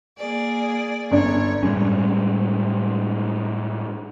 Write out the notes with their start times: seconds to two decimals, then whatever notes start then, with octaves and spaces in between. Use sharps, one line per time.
0.17 A#3 G#4 D5
1.11 G1 D4 C#5
1.63 A2 G3 G#3 C#4